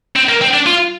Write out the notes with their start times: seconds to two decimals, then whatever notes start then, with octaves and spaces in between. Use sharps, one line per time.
0.16 C4
0.29 A#3
0.42 C4
0.54 D4
0.67 F4